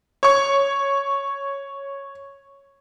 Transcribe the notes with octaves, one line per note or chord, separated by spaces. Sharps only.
C#5 C#6